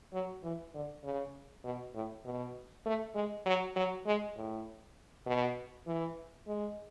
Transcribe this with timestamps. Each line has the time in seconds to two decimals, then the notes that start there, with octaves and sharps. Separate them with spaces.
0.13 F#3
0.43 E3
0.74 D3
1.04 C#3
1.64 B2
1.95 A2
2.25 B2
2.85 A3
3.15 G#3
3.46 F#3
3.76 F#3
4.06 G#3
4.36 A2
5.26 B2
5.87 E3
6.47 G#3